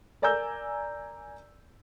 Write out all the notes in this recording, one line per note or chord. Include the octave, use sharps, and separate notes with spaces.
A#4 D5 G#5 A#5 E6 G6